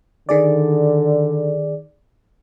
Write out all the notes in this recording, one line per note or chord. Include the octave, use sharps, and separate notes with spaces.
D3 D#3 G#4 D5